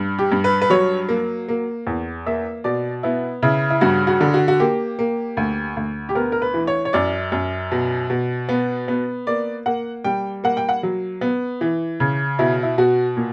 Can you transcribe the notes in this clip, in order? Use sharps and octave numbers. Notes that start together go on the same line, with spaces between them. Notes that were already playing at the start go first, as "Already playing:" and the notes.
Already playing: G2
G4
G2
B4
B4
F#3 C#5
A#3
A#3
E2
A#3 E5
B2 D5
B3 E4
C#3 E4
E4
G2 F#4
F#4
D3
F#4
F#4
A#3 G4
A#3
D2
D2
G4
B3 A#4
A#4
B4
E3
C#5
C#5
F#2 D5
F#2
B2
B2
B3
B3
A#3 D5
A#3 F#5
G3 G5
A#3 F#5
G5
F#5
F#3
B3
E3
C#3
B2 E4
E4
B2 F#4
A#2